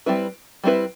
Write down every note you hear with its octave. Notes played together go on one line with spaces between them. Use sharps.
G3 C4 E4 B4
G3 C4 E4 B4